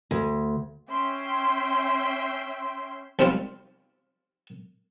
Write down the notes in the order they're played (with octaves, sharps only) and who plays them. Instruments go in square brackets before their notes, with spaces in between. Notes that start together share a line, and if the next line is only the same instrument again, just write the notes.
[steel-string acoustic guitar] D2
[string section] C#4 E5 G5 C6
[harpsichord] C2 G#2 C3 G3 C4 F4